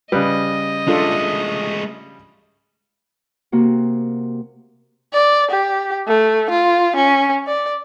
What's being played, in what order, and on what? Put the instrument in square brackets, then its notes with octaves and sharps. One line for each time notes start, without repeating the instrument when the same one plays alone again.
[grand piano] C#3 G3 [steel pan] B4 [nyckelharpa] D#5
[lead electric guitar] G#3 A3 [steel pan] D4 F4 A4
[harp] C3 A#3 F#4
[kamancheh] D5
G4
A3
F4
C#4
D5